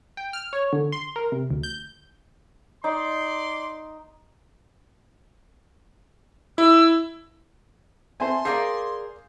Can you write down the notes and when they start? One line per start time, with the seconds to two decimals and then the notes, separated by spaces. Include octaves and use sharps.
0.17 G5
0.33 F6
0.53 C#5
0.73 D3
0.92 C6
1.16 A#4
1.32 C3
1.50 D2
1.63 G6
2.84 D#4 D5 C6
6.58 E4 E6
8.20 C4 C5 E5 G#5 A5 C6
8.45 G#4 A#4 D5 F5 G6 C7